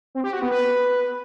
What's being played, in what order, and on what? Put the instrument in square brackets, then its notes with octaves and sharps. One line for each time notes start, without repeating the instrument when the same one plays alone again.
[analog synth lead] C4
G4
F#4
B3
B4